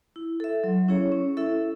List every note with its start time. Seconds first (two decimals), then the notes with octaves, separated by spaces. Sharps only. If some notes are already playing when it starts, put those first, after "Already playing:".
0.16 E4
0.40 A4 E5
0.64 F#3
0.88 C#4 E4 G#4 C#5
1.12 C#4
1.37 E4 A4 E5